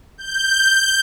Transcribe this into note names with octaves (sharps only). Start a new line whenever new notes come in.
G6